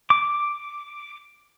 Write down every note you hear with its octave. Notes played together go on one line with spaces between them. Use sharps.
D6